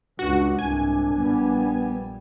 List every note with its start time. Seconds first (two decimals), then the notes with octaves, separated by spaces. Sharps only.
0.19 C#2 D4 F#4
0.59 C2 G#2 D4 G#5
1.15 A#1 G3 B3